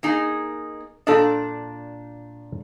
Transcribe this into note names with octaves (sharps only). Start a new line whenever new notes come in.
A#3 D#4 G#4
A#2 D4 A4 D#5